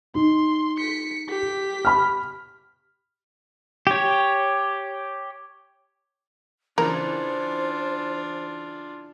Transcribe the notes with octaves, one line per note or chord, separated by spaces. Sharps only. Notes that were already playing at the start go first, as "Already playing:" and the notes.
D#4 C6
B6 C#7
G4 B6
B5 F6
G4 C#5
C#3 E3 D4 F4 A#4 C5